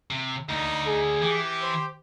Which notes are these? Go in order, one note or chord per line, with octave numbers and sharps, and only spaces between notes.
C3
D2 D#4
G#4
E3 G4
C5